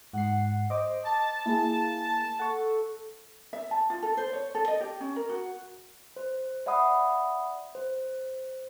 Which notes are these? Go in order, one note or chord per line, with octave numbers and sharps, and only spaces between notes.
G#2 F#5 C7
C5 D#5 D6
A5 A6
A#3 E4 G#4
A4 F#5 C#6
E5
A5
F4
A4
C5
C#5
A4
D#5
G4
C#4
A#4
F#4
C5
D5 E5 F#5 B5 D#6
C5